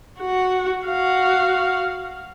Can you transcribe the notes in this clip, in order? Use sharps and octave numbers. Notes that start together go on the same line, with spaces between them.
F#4
F#4 F5